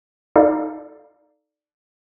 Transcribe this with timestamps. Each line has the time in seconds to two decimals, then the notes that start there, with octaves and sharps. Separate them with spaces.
0.36 D#4 A4 D5 F5